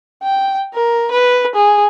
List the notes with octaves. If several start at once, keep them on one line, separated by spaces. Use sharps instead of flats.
G5
A#4
B4
G#4